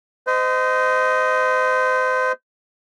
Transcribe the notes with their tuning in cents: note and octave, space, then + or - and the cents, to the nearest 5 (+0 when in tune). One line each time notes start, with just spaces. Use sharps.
C5 -30 D#5 +0